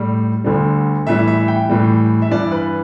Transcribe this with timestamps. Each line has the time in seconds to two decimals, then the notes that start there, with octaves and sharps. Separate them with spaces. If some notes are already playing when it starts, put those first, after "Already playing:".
Already playing: A2 G3
0.44 D2 D3 G3
1.07 A2 E3 G3 E5
1.27 E5
1.48 G5
1.69 A2 E3 G3
2.22 E5
2.31 G2 E3 G3 D5
2.52 B4